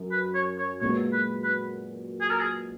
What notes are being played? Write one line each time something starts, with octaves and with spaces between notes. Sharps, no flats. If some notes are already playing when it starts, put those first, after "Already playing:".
Already playing: F#2
B4
C#5
C#5
A#2 G#3 B3 F#4 C#5
B4
B4
G#4
A#4
G#4